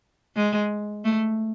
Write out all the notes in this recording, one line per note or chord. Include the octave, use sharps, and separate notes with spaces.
G#3
A3